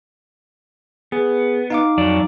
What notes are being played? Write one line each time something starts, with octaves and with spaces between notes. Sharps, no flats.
B3 G#4
D#4 F5 D6
F2 F#3 D5